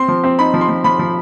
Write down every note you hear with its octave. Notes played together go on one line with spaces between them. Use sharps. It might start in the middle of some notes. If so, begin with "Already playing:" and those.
Already playing: C4 C6
F3
C4
D#4 B5
F3
C6
F3
F3 B5
F3